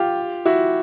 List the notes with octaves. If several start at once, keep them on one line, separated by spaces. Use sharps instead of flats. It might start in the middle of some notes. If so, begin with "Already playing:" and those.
Already playing: F4 G4
E4 F#4